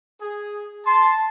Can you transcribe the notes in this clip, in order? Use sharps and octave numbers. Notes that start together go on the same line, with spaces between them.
G#4
A5 C6